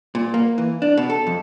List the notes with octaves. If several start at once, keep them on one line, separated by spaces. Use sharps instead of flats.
A#2
A#3
E3
D4
B2
A4
F2